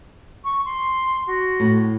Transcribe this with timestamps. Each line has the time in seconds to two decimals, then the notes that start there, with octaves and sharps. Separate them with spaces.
0.44 C#6
0.65 C6
1.26 F#4
1.60 A2